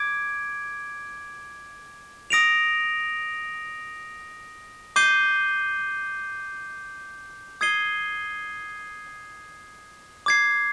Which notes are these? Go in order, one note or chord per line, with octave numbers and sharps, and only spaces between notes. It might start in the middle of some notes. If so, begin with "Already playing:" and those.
Already playing: D6 G#6 D7
D#6 A#6 D7 F7
D6 G6 C7 D#7 G7
D#6 G#6 C7 D#7 G7
D6 G#6 C7